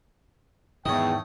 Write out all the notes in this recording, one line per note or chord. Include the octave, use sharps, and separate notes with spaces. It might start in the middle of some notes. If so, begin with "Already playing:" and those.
E2 G#2 D#3 A3 C#5 D#5 G5